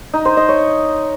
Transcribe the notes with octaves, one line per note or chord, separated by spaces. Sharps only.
D#4
C5
D#5
C#5